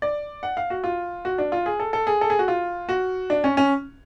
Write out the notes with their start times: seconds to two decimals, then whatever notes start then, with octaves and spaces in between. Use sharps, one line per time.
0.02 D5
0.43 F#5
0.57 F5
0.70 F#4
0.84 F4
1.25 F#4
1.38 D4
1.52 F4
1.66 G#4
1.80 A4
1.93 A4
2.07 G#4
2.21 A4
2.30 G#4
2.39 F#4
2.48 F4
2.89 F#4
3.30 D4
3.44 C#4
3.57 C#4